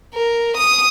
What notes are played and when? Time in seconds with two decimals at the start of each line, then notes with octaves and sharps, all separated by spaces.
0.15 A#4
0.57 D#6